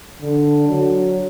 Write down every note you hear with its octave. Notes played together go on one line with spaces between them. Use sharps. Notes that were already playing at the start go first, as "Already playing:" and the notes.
D3
F#3